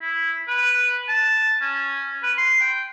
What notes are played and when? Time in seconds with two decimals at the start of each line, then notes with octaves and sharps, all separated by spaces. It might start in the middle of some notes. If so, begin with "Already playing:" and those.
0.01 E4
0.48 B4
1.08 A5
1.61 C#4
2.23 B4
2.38 C6
2.61 G5